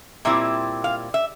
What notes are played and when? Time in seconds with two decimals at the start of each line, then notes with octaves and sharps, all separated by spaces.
0.25 A#2 G3 C4 E4 E5
0.84 F5
1.14 E5